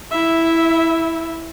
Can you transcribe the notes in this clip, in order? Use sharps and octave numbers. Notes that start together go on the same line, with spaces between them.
E4 E5